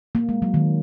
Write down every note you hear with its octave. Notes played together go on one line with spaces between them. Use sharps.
A#3
G#3
F#3
D#3